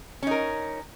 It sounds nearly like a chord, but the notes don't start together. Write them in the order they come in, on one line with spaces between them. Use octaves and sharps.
C#4 D#4 A#4